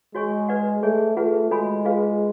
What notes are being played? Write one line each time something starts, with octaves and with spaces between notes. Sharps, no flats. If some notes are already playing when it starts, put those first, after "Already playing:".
G#3 F#4 C#5 G#5 C#6
B4 D5 F#5
A3 G#4 C#5 G#5
A3 F4 G#4 B4 F#5
G#3 F#4 A4 C#5 G#5 B5
F4 G#4 B4 F5